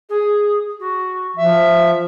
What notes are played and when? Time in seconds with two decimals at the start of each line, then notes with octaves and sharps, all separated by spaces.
0.10 G#4
0.80 F#4
1.37 F3 E5